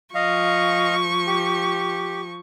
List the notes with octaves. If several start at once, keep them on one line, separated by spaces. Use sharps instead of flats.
F3 D#5 F5 C#6
G4